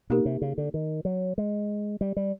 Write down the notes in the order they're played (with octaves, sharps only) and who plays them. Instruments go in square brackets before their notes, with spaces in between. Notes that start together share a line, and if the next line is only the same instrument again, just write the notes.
[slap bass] B2 [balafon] A#3 D#4 G4 A#4
[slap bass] C3
C#3
D3
D#3
F#3
G#3
G3
G3